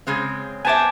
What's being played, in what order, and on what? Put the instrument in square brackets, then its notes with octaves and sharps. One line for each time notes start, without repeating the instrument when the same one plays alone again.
[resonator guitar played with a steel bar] C#3 G#3 C4
[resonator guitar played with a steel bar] B3 C5 E5 [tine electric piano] G#5 A5 D6